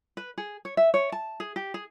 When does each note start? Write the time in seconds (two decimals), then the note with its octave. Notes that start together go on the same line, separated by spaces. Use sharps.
0.17 B4
0.38 G#4
0.65 C#5
0.77 E5
0.94 C#5
1.12 A5
1.40 G#4
1.56 G4
1.74 G#4